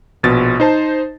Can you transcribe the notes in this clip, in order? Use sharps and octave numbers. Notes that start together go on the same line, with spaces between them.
A#1 B2 A6
D#4 C5 A5